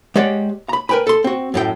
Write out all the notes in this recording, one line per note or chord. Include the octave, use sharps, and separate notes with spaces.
G#3 G4 C#5 D5 F#5
A#5 B5
A#4 B4 G5 G#5 B5
A4 C6
C4 F#4
F#2 A2 G4 G5